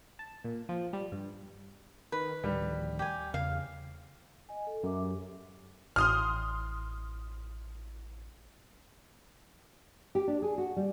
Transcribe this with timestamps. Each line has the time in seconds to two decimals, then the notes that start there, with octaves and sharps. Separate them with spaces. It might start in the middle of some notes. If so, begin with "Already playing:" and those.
0.19 A5
0.44 A#2
0.69 F3
0.93 G3
1.12 G2
2.12 D#3 B4
2.44 D2 A2 D#3 F3 G3
2.99 G4 G#5
3.34 E2 C#3 F5
4.49 D#5 G#5
4.67 A4
4.83 F#2 E5 D6
5.02 G4
5.96 A1 C6 D#6 F6
10.15 G4
10.28 D4
10.42 G#4
10.58 F#4
10.76 G3